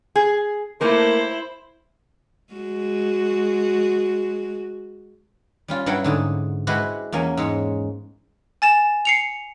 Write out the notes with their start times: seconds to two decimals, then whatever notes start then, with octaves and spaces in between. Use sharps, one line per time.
0.16 G#4
0.81 A3 A#3 E4 A#4 C5
2.53 G#3 F#4
5.68 G3 C#4 F4
5.86 G2 F#3 E4 C#5 F#5 G5
6.04 G#2 D3 G#4
6.67 G#3 E4 F#4 G4 B4 C5
7.12 E2 A#3 C#4 G#5
7.37 G#2 G#3 C#5
8.62 G#5 A6 E7
9.05 C7 C#7 F7